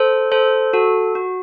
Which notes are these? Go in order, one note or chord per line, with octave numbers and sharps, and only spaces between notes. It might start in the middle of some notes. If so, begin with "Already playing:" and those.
Already playing: A4 C5
A4 C5
F#4 A4
F#4